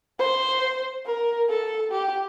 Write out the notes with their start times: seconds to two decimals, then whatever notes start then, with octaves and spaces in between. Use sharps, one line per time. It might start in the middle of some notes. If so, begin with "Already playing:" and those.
0.19 C5
1.06 A#4
1.50 A4
1.92 G4